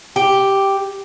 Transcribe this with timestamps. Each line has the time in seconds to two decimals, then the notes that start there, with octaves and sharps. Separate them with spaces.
0.16 G4